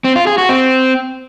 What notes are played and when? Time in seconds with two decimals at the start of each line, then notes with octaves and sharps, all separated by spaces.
0.04 C4
0.16 F4
0.27 G#4
0.38 F#4
0.49 C4